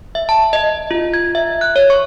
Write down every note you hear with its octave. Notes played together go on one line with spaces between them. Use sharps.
E5
A5
D#5
F4
G#6
E5
F#6
C#5
C#6